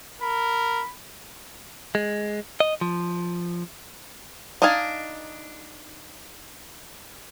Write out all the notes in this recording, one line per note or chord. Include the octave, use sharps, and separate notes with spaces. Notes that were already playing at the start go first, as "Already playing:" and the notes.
A#4 B5
G#3
D#5
F3
D4 D#4 D#5 F5 G#5